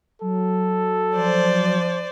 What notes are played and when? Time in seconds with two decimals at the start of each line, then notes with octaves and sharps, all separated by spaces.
0.21 F#3 A4
1.16 F3 C5 D5